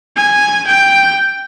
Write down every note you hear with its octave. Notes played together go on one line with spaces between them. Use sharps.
G#5
G5